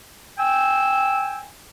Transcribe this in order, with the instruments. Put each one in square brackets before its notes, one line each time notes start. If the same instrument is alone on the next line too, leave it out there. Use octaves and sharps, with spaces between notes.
[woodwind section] G5 G#5 E6